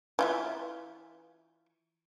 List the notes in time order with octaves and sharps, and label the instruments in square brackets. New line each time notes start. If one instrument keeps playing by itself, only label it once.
[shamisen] E3 F4 E5